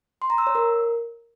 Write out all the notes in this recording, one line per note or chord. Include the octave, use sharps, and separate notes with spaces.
C6
A#5
E6
C#5
A#4